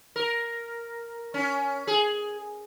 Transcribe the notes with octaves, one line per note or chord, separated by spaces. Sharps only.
A#4
C#4
G#4